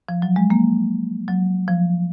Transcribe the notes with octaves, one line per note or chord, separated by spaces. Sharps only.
F3
F#3
G#3
A#3
F#3
F3